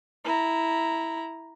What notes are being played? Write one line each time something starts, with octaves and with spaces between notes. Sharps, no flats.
E4 A#5